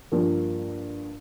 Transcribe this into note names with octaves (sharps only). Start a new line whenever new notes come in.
G2 F3 A#3